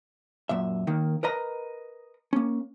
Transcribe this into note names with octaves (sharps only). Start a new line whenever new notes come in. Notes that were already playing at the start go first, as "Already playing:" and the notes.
F#2 A#2 E5
D#2 D#3 A#3
A#4 B4 D#5 A#5
A#3 C#4